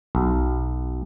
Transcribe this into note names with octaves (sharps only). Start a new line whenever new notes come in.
B1